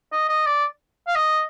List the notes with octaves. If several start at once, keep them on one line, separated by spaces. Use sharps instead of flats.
D#5
D#5
D5
F5
D#5